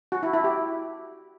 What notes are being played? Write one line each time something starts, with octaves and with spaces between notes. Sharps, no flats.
F#4
E4
E4
G4